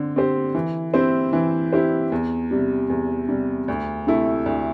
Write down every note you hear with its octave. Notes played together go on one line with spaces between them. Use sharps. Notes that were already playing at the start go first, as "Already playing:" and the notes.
Already playing: D3 C4
C4 G4 C5
E3
C4 E4 G4 C5
E3
C4 E4 G4 C5
E2
C3 G3
E2
C3 G3
D2
C3 A3 E4 A4
D2